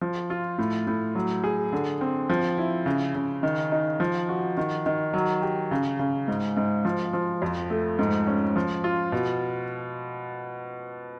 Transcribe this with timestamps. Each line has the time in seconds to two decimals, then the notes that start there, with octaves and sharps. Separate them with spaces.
0.01 F3
0.30 F4
0.58 A2
0.87 A2
1.15 F#3
1.44 G#4
1.72 D3
2.01 C4
2.30 F3
2.58 E4
2.86 C#3
3.15 C#3
3.43 D#3
3.72 D#4
4.00 F3
4.29 F#4
4.57 D#3
4.86 D#3
5.13 F#3
5.42 G4
5.71 C#3
5.99 C#3
6.28 G#2
6.57 G#2
6.85 F3
7.13 F3
7.42 F2
7.70 A3
7.99 G#2
8.27 C#4
8.56 F3
8.84 F4
9.12 B2